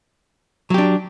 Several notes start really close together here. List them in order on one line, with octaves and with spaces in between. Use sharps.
F#3 G4 D4